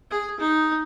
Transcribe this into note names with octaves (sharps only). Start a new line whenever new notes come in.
G#4
D#4